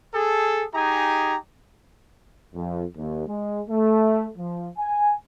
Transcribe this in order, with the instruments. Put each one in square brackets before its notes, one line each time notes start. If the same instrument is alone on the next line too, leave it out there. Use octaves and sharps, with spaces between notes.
[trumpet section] G#4 A4
D#4 G4 G#4 G#5 A#5
[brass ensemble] F2
D#2
G#3
A3
F3
G#5